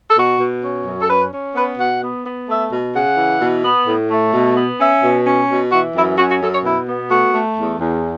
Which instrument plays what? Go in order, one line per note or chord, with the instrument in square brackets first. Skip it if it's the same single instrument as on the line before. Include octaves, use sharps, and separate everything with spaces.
[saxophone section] A4
B2 F#4
B2
C#4
F#2
A4
C#4 B4
C#4
B3 B4
B2 F#5
B3
B3
A3 E5
B2
C#3 F#5
E3
B2
B3
A2
A3
B2
B3
C#4 E5
B2
C#4
B2
E3 F#4
F#2 E4
C#4 F#4
F#4
F#2 A4
C#5
B2 E4
B3
A3 F#4
A3
E2
E2